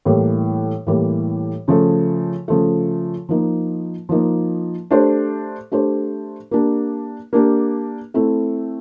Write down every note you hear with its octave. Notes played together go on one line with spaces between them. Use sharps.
A2 E3 G3 A#3
A2 E3 G3 A#3
C#3 F3 A3
C#3 F3 A3
F3 A#3 D#4
F3 A#3 D#4
A3 D4 G4 C5
A3 D4 G4 C5
A#3 D4 G4
A#3 D4 G4
A3 C4 E4